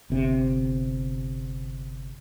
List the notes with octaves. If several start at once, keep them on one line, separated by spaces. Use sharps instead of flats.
G1 C3